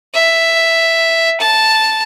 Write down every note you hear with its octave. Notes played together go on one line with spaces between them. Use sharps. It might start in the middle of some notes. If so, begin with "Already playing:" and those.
E5
A5